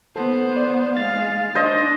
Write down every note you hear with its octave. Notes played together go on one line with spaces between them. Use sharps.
B3 A4 C5
D5
G#3 F5 A6
D4 C5 D#5